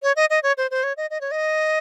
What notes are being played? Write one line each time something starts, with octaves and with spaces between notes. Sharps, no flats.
C#5
D#5
D#5
C#5
C5
C5
C#5
D#5
D#5
C#5
D#5